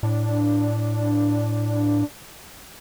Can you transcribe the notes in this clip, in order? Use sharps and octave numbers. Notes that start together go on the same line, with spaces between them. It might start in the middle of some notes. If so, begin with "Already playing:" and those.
A2 D4